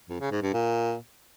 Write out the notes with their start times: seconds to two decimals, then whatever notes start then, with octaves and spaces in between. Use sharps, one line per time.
0.09 F2
0.20 C#3
0.31 G#2
0.42 G2
0.53 A#2